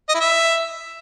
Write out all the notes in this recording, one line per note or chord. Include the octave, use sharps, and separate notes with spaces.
D#5
E4
E5